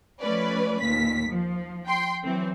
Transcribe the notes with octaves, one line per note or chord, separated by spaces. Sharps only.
F3 A3 C#4 B4 D5
D#2 A#2 B6
F3
G5 C6
E3 F#3 C4